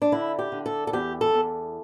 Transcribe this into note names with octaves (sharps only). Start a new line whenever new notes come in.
D4
D3 E4
G4
D3
A4
A4
E2 G4
A4
E2